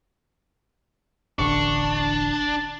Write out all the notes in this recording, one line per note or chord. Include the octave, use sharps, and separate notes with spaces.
E1 A1 D3 D4 C#6
A5